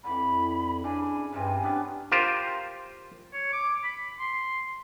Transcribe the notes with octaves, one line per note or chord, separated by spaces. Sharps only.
F2 D3 E3 B5
C#3 D4 G#5
G2 C3 G3 C4
B3 C#4 D4 B4
F4 G4 A#4 C5
C#5
D6
B5
C6